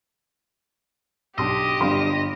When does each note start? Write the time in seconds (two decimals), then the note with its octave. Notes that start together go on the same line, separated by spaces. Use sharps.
1.38 B1 D4 G4 D#5 C6 E6
1.81 G1 G2 F5 B5 C6